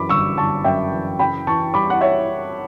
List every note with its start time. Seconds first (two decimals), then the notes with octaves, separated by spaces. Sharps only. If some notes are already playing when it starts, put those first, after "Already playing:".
Already playing: F#2 E3 B5 D6
0.09 G1 C#6 E6
0.37 G1 A5 C#6
0.64 F#2 E5 G5
0.91 E3
1.19 C#3 G5 B5
1.47 E3 A5 C#6
1.73 G3 B5 D6
1.90 F#5
2.01 C#5 E5